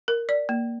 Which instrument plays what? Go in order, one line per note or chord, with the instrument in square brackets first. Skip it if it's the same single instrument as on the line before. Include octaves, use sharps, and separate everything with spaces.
[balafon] A#4
D5
A#3